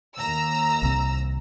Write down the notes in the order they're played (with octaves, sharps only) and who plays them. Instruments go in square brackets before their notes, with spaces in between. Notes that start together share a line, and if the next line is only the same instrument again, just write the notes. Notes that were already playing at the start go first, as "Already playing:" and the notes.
[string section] D#2 A#5 E6
[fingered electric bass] C2 C3